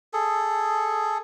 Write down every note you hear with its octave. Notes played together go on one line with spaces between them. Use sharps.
G#4 A4